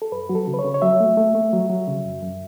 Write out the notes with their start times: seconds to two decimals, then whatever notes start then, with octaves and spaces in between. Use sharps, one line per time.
0.02 A4
0.12 F#2 B4
0.29 F#3 F#4
0.35 A4
0.47 C#3
0.54 B4
0.59 C#5
0.64 C#3
0.74 C#5
0.82 F#3 E5
1.00 A3
1.17 A3
1.35 A3
1.53 F#3
1.70 F#3
1.88 C#3
2.05 F#2
2.23 F#2